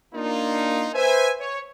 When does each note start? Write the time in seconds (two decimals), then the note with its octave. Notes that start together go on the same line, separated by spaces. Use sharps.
0.14 A#3 D4 D#4 F4
0.95 B4 C5 E5 G#5
1.39 C#5